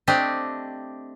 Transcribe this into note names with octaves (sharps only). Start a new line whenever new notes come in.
A3 C4 D4 G4 D#5